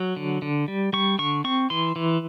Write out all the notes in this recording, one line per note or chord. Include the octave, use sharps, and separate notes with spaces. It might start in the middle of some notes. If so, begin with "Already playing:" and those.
Already playing: F#3
D3
D3
G3
G3 C#6
D3 C#6
C4 C#6
E3 C6
E3